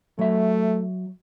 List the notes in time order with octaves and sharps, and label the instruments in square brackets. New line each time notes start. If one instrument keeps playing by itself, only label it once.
[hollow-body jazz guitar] F#3 E5 [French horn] A3